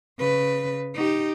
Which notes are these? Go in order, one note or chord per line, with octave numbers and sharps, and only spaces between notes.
C#3 B4
D#4 G4